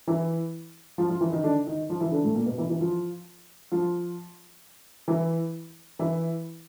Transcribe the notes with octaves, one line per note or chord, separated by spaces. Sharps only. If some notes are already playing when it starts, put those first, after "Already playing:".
E3 E4
F3 F4
F3 F4
E3 E4
D#3 D#4
D3 D4
D#3 D#4
F3 F4
E3 E4
D3 D4
A2 A3
A#2 A#3
B2 B3
E3 E4
E3 E4
F3 F4
F3 F4
E3 E4
E3 E4